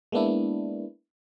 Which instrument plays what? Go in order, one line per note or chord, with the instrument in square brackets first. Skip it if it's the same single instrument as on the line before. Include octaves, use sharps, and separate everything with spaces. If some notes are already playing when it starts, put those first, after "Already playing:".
[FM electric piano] G#3 A#3 B3 D4 E4